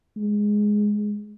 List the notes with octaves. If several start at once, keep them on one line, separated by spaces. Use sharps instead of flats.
G#3